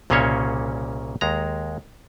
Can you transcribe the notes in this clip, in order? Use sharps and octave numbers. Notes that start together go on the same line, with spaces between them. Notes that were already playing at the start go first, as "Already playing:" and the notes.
C2 A#2 C#3 A#3 C#4 C#5
D#2 G#3 A#5